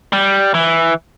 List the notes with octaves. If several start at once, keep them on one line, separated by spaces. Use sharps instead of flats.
G3
E3